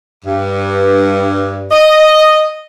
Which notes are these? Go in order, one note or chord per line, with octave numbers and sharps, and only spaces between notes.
G2
D#5